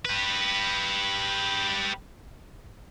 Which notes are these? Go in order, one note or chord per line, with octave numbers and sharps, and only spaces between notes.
G4 B4